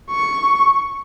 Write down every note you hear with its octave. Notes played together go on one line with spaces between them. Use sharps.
C#6